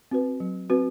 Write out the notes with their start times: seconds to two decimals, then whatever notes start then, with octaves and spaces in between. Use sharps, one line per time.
0.11 C4 F#4 B4
0.40 F#3
0.70 C4 F#4 B4